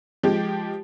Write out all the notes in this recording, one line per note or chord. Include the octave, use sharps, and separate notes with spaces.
F3 G#3 G4